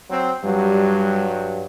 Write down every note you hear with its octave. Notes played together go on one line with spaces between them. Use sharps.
F#3 C4
G2 F#3 G3